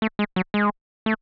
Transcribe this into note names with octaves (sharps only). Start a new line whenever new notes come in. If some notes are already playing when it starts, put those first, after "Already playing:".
A3
G#3
F#3
G#3
A3